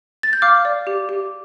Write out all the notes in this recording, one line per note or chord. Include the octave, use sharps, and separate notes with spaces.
A6
G6
F5 D6 F6
D5
G4
G4